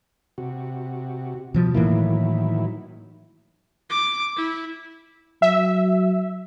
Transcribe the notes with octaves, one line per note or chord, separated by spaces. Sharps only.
C3 F#4
B2 F3
A2 D#3 E3 F#3 A#3 E4
D6
E4
F#3 E5